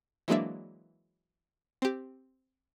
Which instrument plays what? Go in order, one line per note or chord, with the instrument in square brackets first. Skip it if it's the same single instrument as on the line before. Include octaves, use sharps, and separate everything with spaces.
[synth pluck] E3 F#3 G#3 A#3 D4 E5
C4 G4